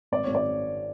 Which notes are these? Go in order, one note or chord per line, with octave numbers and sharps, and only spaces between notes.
G#1 D5
G#1 C#5
D5